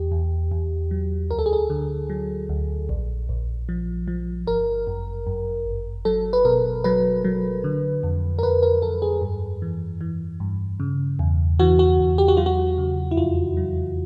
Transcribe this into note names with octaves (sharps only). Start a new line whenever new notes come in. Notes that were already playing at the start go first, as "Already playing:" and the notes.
Already playing: E2 G4
E2
E2
F#3
D2 A#4
A4
G#4
A4
D3
F#3
D2
A#1
A#1
F3
F3
G1 A#4
F#2
F#2
G1
F#3 A4
B4
B2 A#4
F#3 B4
F#3
D3
F2
A#4
F2 B4
A#4
F2 A4
G#4
G2
E3
E3
G2
C#3
E2
E3 F#4
F#4
E2
G4
F#4
F#3 F4
F#4
C#3
E4
F2 F4
F#3